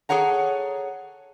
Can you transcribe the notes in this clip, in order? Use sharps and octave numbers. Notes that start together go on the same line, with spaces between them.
G#4 A4 C#5 F#5 A#5